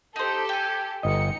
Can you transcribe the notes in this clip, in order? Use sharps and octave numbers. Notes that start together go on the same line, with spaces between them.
D#4 G4 A4 C5
G5 G#5
G1 D#4 D#5 C#7